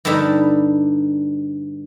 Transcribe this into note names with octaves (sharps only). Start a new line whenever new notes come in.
G2 D3 D4 D#4 B5